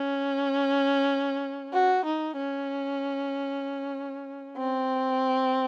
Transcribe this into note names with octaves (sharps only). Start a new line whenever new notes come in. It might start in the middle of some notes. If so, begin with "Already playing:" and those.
Already playing: C#4
F#4
D#4
C#4
C4